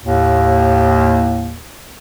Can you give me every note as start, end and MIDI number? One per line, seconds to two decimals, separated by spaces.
0.05 1.56 39
0.05 1.56 45